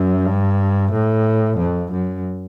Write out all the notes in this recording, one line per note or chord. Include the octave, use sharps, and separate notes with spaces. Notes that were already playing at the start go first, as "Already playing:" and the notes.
Already playing: F#2
G2
A2
F2
F#2